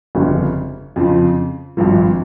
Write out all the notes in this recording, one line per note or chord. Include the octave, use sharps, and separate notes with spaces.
G1 F2 C#3 G3 C#4
F2 C#3 F3
G#1 G2 F3